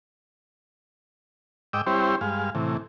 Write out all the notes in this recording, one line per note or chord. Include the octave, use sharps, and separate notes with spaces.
G#2 D#5 G5 D6 E6
G3 C4 E4 G4 C5 C#5
G2 G#3 F5
A2 C3 E3